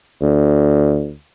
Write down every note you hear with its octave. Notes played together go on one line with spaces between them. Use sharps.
D2